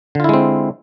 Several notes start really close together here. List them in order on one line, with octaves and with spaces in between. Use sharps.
D3 F4 E4 G#3 C4